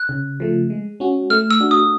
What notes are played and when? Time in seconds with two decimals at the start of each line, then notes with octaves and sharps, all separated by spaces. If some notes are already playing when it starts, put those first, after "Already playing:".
Already playing: F#6
0.09 C#3
0.40 F3 A3
0.70 G#3
1.00 C#4 F#4
1.30 A3 F6
1.51 E6
1.60 D4 F#4
1.71 D#6